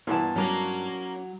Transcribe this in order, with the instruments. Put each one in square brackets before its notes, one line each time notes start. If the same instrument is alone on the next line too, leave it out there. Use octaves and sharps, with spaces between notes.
[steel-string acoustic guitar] G2 A5 [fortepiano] A#2 E3 B3
[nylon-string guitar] F#3 [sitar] A#3 C#4